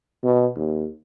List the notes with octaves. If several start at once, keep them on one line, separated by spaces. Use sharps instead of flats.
B2
D#2